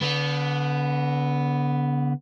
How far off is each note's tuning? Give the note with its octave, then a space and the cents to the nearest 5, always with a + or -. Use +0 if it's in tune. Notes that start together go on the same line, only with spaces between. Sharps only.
D3 -35 B3 +0